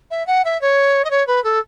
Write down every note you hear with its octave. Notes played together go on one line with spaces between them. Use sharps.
E5
F#5
E5
C#5
D#5
C#5
B4
A4